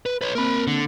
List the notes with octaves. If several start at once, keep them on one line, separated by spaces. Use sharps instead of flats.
B4
B4 C#5
A#3 C4 A#4 B5
D3